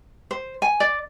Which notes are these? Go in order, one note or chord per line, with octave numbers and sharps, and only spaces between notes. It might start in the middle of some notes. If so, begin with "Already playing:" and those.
C5
G#5
D5